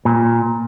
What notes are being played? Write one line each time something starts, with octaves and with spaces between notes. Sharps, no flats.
A#2